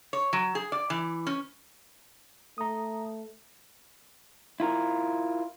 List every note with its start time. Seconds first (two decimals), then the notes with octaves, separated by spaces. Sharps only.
0.13 C#5
0.33 F#3
0.55 G#4
0.72 D5
0.90 E3
1.27 C#4
2.58 A3 A#5 D#6
4.60 E4 F4 A#4